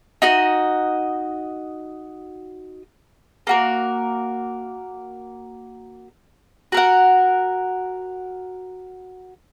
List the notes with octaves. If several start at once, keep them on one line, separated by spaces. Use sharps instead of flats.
D#4 F#4 D#5
A#3 F#4 A#4
F#4 A#4 F#5